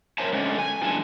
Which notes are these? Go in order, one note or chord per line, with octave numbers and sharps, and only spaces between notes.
A#4 C5 C#5 E5 G#5 A5
D3 G#3 A3 C#4
G#5
E3 G#3 D4 F4 G#5 A5